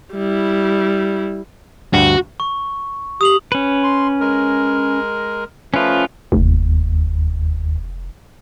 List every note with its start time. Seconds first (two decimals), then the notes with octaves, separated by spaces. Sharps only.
0.14 G3 E4
1.93 D2 G2 F#4
2.40 C#6
3.21 G4 D#6 F7 F#7
3.52 C#4 B4
3.83 C6
4.20 G#3 A#4
5.74 F3 A3 C#4 F4 B4
6.32 F1 D#2